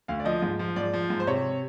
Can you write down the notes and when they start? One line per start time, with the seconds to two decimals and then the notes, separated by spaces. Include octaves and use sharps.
0.08 D2 F5
0.20 D5
0.25 F3 D#5
0.42 G#2
0.59 F3
0.76 G#2 D5
0.93 F3
1.10 G#2
1.20 C5
1.27 C3 C#5